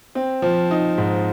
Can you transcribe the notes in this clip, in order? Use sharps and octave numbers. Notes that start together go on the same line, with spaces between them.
C4
F3
D#4
G#2